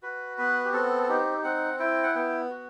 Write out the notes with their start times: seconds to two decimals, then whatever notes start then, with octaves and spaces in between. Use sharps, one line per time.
0.02 F#4 B4
0.38 B3 B4
0.65 G4
0.73 C4 A4
1.03 A4
1.09 D#4 G4
1.44 C4 F#5
1.79 E4 G5
2.03 F#5
2.15 B3 G5
2.50 F#4